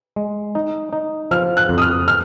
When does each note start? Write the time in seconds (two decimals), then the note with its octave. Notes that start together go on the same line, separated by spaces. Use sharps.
0.16 G#3
0.55 D#4
0.93 D#4
1.31 F3 F6
1.57 F#6
1.69 F2
1.78 D#6
1.82 F6
2.08 F6